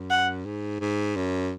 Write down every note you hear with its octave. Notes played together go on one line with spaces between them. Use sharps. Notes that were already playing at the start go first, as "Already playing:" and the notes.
Already playing: F#2
F#5
G#2
G#2
F#2